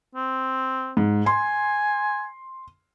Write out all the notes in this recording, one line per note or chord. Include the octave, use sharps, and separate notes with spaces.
C4
G#2
G#5 C6